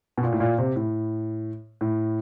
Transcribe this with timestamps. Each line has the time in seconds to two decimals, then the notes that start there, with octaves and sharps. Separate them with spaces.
0.18 B2
0.23 A#2
0.33 A2
0.40 A#2
0.58 C3
0.76 A2
1.81 A2